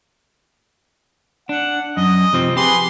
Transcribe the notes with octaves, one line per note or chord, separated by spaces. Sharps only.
D4 F#5
F#2 D#5
C3 F3 C4
G4 G#4 B4 C6